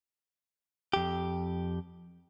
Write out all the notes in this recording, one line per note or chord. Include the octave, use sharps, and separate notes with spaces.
F2 G4